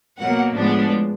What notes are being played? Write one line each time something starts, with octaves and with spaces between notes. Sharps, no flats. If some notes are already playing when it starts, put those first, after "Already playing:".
B2 F#3 A#3 F#5
A2 F3 G#3 B3 D4